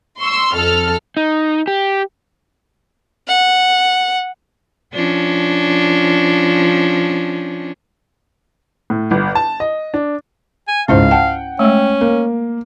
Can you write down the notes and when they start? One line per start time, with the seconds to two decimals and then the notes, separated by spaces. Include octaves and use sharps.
0.19 C6 C#6 E6
0.54 F2 A4 F6
1.17 D#4
1.68 G4
3.28 F#5
4.94 F3 C#4 D4
8.90 A2
9.11 G1
9.35 A5
9.60 D#5
9.94 D4
10.68 G#5
10.88 C#2 G#2 C#4 E4 C5 F5
11.11 F#5 G5 A5
11.59 G#3 A3 C#4
12.01 A#3 A#4